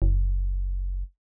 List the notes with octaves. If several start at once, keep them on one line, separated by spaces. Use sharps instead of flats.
F#1